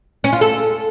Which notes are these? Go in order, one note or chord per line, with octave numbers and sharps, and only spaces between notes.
C#4
F4
A4